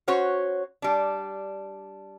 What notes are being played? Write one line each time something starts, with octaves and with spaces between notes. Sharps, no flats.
C#4 F#4 C5 C#5
G3 D4